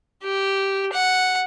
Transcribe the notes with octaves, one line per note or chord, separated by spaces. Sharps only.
G4
F#5